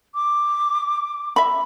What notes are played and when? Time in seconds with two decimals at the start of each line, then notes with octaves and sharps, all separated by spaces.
0.14 D6
1.36 E5 B5